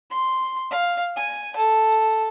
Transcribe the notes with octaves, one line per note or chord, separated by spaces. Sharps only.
C6
F5
G#5
A4